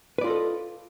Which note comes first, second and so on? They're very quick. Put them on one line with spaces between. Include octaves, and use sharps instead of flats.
B4 D5 F4 D#5 A4